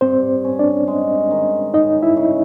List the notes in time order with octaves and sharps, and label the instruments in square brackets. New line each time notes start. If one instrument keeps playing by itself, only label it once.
[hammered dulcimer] G2 [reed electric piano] C4 C5
[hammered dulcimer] C#4
[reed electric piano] D4 D5
[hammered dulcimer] G#3
D#3
[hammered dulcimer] C#3 [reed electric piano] D#4 D#5
[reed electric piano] E4 E5
[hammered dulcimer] C#3